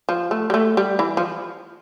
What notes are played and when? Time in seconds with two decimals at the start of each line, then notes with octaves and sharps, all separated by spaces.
0.09 F3
0.31 A3
0.50 G3
0.54 A3
0.77 G3
0.99 E3
1.17 F3